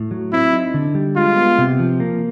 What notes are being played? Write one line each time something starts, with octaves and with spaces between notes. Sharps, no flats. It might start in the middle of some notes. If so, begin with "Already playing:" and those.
Already playing: A2
F#3
C4 E4
D#4
D3
G3
G#3 F4
B3
C3
F3
A#3